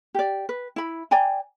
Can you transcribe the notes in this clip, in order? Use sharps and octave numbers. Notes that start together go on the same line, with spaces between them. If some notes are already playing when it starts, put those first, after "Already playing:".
G4 D5
B4
E4 B5
D5 G5 G#5 A#5